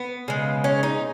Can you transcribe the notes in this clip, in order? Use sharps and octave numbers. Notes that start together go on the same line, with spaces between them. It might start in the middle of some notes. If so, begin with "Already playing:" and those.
Already playing: B3
C#3 G#3
C#4
D#4